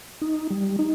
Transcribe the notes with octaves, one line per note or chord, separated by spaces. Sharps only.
D#4
G3
D#4